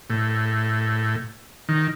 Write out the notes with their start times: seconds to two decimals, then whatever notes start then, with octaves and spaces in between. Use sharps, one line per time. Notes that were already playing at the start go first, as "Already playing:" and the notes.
0.10 A2
1.69 D#3